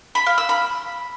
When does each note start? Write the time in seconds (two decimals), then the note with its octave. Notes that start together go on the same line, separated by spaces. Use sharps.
0.15 B5
0.26 F5
0.38 E6
0.49 B5